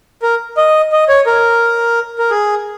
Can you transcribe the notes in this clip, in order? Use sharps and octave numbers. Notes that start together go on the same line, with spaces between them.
A#4
D#5
D#5
C#5
A#4
A#4
G#4